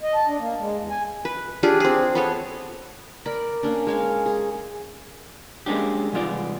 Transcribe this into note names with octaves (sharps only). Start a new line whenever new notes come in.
D#5
A5
D4
A#3
G#3
E2
G#5
B4
D4 F4 G4 G#4
C4 G#4
B3 A4 C#5
A#4 D5 B5
A#3 C#4 D4
G#3 C#5 F5
G#4
G#3 A#3 C#4 D4 G4
C2 G#2 E3 B3 F4 D5